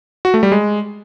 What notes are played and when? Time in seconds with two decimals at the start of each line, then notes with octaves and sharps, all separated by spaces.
0.25 F#4
0.34 A3
0.43 G3
0.52 G#3